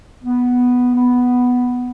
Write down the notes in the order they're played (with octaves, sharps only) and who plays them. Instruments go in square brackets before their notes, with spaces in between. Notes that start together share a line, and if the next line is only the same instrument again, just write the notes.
[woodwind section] B3
B3